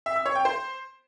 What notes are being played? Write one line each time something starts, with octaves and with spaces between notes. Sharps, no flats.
E5
E6
C#5
G5
C5